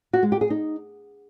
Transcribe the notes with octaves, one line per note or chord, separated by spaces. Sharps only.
F#4
G#3
G4
G#4
D#4